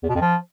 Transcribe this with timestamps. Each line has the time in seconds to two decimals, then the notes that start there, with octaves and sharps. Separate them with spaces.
0.03 E2
0.09 B2
0.15 F2
0.21 F3